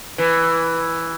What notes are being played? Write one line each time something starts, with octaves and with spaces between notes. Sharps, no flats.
E3